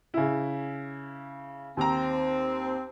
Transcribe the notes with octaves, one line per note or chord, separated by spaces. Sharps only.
C#3 E4
D#2 C4 A#5